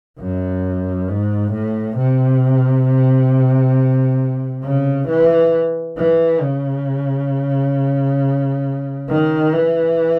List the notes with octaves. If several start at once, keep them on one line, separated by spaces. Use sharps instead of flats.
F#2
G#2
A2
C3
C#3
E3
E3
C#3
D#3
E3